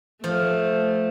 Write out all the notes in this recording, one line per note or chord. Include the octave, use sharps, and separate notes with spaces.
F3 A3 F5